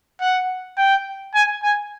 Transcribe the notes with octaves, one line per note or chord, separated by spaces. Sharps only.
F#5
G5
G#5
G#5